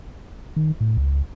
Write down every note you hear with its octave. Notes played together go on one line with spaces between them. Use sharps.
D#3
A2
C#2